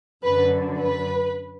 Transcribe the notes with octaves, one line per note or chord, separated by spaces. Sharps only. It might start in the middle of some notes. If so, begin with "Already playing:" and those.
F#2 D3 F#3 B4
B4